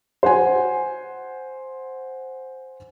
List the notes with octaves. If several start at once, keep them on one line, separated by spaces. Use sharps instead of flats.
C5 F#5 G#5